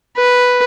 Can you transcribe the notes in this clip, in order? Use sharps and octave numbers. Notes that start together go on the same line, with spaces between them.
B4